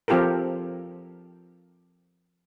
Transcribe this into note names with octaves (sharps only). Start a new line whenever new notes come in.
F3 C4 F4 G4 A4 A#4